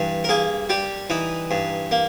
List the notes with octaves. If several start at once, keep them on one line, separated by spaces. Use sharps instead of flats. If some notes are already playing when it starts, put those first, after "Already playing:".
Already playing: G2 E3
A#4
A#3 G#4
G3 G4
E3 D#4
G2
A#3